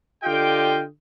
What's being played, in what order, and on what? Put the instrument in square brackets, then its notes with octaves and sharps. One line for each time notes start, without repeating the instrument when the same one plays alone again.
[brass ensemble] D3 F4 G4 D#5 F5 G5